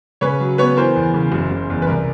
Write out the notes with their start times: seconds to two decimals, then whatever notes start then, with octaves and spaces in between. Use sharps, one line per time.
0.21 C#3 B4 C#5
0.40 F#3
0.58 B3 B4 C#5
0.77 E3 A#4 C5
0.96 E2
1.14 C#3
1.32 F#1
1.51 F#1
1.70 E2
1.82 B4
1.87 C2 A#4